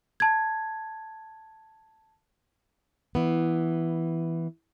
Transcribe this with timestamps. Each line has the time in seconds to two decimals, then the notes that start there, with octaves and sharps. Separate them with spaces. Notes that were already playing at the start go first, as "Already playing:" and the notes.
0.20 A5 G#6
3.15 E3 B3